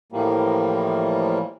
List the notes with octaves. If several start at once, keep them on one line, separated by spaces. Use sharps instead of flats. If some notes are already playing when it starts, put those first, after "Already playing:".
A2 E3 F3 G3 A#3